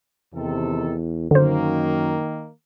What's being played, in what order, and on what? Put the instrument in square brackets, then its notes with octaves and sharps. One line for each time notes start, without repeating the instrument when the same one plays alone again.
[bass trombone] E2 [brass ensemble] C3 D#3 A4
[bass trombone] F#2 [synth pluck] D3 C5 [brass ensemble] D#3 A#3